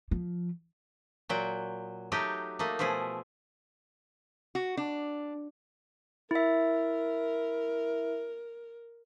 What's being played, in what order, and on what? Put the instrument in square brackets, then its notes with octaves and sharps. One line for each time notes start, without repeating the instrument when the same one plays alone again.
[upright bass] F3
[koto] A#2 F#3 G5
F#3 A3 D#4 G4
A3 A#3 D#4
B2 F3 A3 E4 G#4
[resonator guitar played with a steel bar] F#4
D4
[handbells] E4 E5 [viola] A#4